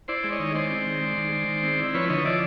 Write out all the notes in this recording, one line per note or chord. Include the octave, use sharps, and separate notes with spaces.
E4 C5 D5
G#3
C#5 D#5
D#3
G#3 C5 D5
C4
D#3
G#3
D#3
G#3
D#3
C4
E4
F3 B4 C#5
D3 C#5 D#5
F3 D5 E5